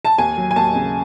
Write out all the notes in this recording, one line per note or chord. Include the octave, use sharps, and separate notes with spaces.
A5
D#2 G#5
F#3
G#5
D#2 A5
C#3